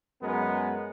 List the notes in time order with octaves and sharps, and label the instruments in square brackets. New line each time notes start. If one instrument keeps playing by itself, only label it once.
[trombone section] F#2 G#3 B3 A#4